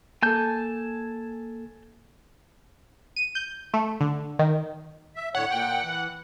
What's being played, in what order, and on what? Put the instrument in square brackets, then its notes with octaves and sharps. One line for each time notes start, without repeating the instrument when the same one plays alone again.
[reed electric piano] A#3 A4 [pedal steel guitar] G#5 A5 G6
[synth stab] D#7
G6
A3
D3
D#3
[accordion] E5
[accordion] A2 D3 C#5 [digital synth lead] F#5
[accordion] A#2 G5
E3